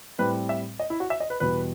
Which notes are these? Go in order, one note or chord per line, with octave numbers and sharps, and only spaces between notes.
A2 G3 C4 B4
E5
D#5
E4
F#4
E5
D#5
B4
E2 B2 G3 B4